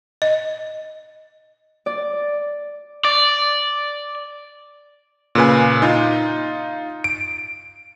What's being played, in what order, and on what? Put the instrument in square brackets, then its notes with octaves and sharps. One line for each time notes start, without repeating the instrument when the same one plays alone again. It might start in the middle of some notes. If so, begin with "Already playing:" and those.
[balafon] D#5
[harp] D5
[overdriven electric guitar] D5
[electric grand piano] A#2 C#3 B4 G#5
D#4 F4
D7